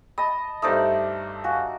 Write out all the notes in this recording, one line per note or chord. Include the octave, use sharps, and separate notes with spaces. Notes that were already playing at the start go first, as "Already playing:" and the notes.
D#5 A5 B5 D#6
G2 A3 D#4 C5 D5 D#6 E6
F#4 F5 G#5